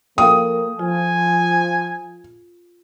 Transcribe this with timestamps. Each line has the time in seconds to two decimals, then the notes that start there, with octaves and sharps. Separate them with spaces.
0.18 F3 A#3 A4 F5 G5 D#6
0.79 F3 F4 G#5